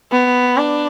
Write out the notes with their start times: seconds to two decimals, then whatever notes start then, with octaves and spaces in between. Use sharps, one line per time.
0.11 B3
0.57 D4